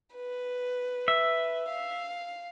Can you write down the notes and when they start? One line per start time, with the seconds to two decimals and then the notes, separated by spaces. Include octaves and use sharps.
0.16 B4
1.08 E5
1.69 F5